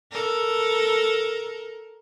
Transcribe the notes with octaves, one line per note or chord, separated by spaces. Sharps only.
A4 A#4